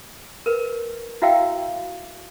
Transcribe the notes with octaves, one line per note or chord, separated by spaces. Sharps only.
A#4 B4
E4 F#4 E5 F5 G5 E6